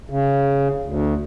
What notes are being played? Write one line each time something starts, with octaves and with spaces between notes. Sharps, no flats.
C#3
D2